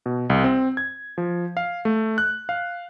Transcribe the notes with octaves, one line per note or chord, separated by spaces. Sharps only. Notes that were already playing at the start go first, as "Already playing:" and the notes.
B2
C2
C4
G#6
F3
F5
A3
F#6
F5